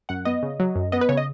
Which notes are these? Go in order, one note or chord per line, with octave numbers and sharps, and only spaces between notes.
F#2 F#5
B3 D#5
C#3
F#3
F#2
B3 D#5
B4
C#3 C#5
D#5